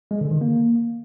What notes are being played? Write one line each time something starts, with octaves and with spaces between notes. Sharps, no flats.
G#3
D3
D#3
A#3